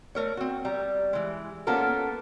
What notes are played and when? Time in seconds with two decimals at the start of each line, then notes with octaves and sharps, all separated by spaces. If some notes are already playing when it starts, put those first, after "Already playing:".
0.15 A3 A#4 C#5
0.37 C4 F#4
0.65 G3 A#5
1.13 E3 G#3
1.67 A#3 B3 C#4 F4 A4 A#4